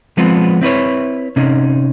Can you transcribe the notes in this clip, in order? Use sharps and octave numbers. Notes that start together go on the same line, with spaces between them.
F3 G#3 B3 C4 F4
C4 E4 B4 C#5
C3 C#4 D#4